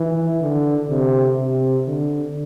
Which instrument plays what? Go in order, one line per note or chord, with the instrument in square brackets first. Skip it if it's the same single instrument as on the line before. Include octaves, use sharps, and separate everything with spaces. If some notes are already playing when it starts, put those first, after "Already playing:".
Already playing: [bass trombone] E3
D3
C3
C3
D3